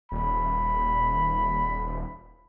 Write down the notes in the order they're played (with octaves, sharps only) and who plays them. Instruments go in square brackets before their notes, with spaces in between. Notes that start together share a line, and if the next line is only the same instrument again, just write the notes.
[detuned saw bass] D#1 [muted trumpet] B5